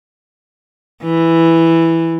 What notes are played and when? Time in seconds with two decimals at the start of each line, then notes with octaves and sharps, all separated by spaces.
1.03 E3